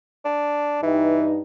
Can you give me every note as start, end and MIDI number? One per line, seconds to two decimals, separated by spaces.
0.25 0.82 62
0.83 1.42 43
0.83 1.28 52
0.83 1.42 63